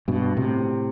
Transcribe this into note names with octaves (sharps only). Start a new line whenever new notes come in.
G2 B2
A2 C3